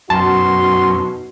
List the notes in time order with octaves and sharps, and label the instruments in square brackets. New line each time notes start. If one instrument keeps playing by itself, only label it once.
[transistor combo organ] F#2 [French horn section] B2 D#4 F#4 [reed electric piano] A5 [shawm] C6